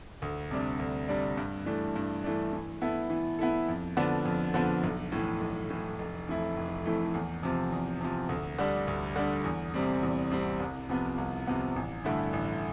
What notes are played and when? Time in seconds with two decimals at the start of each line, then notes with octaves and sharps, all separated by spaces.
0.22 D2
0.51 C3 G3 D4
0.79 D2
1.08 C3 G3 D4
1.37 G2
1.66 E3 A3 D4
1.96 G2
2.24 E3 A3 D4
2.53 E3
2.81 B3 E4 A4
3.10 E3
3.39 B3 E4 A4
3.68 F2
3.97 D3 F3 B3 D4
4.25 F2
4.54 D3 F3 B3 D4
4.84 B1
5.12 A2 E3
5.41 B1
5.70 A2 E3
5.98 F1
6.28 F2 E3 A3 E4
6.57 F1
6.85 F2 E3 A3 E4
7.14 E2
7.43 C3 F3
7.72 E2
8.01 C3 F3
8.29 D2
8.58 D3 G3 D4
8.88 D2
9.16 D3 G3 D4
9.44 E2
9.74 C3 G3 C4
10.03 E2
10.32 C3 G3 C4
10.60 C2
10.89 C3 F3 B3
11.18 C2
11.47 C3 F3 B3
11.76 A1
12.04 G2 D3 A3 E4
12.33 A1